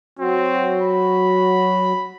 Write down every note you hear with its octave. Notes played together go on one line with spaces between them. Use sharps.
F#3 C4 F#4
B5